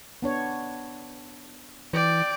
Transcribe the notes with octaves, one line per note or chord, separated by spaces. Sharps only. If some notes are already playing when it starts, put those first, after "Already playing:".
B3 D4 C#5
E3 D5 G5